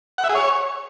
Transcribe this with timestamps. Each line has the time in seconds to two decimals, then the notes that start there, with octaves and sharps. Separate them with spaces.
0.18 F#5
0.24 E5
0.29 G#4
0.35 C#5